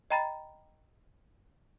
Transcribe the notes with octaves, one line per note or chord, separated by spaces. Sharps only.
D#5 G5 A#5 B5 A6